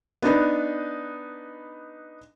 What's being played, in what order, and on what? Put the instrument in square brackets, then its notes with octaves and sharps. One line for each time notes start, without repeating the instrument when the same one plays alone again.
[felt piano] B3 D4 D#4 B4